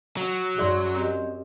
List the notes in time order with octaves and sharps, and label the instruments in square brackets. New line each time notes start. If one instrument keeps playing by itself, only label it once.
[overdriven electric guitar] F#3
[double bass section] F#2 [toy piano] G#4 D5 C6
[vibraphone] C4 G4 D#5